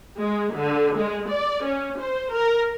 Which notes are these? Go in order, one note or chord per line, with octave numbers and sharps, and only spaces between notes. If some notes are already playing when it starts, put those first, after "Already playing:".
G#3
D3
G#3
D5
C#4
C5
A#4